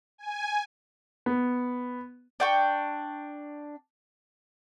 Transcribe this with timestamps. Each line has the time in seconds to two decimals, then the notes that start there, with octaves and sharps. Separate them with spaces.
0.18 G#5
1.26 B3
2.40 D4 G5 C#6